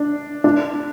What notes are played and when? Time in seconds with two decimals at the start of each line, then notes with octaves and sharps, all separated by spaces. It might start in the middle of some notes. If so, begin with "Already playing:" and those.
Already playing: D4
0.44 D4